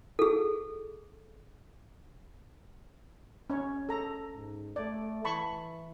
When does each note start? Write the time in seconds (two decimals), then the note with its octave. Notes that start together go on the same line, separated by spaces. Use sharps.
0.19 G#4 A4
3.50 C#4 C#5
3.89 A4 A#5
4.34 G#2
4.76 A3 D5
5.25 E3 A5 B5 C#6